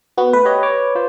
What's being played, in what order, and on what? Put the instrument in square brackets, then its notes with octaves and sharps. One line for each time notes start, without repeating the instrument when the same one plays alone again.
[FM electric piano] B3 F#4
[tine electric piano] A3 [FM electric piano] B4
[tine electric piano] G4 C#5 D#5
C#5 D6
F4 C5